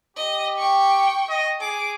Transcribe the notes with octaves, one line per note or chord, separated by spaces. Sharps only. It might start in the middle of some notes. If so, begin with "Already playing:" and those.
G4 D#5
G5 C#6
D#5
G#4 D6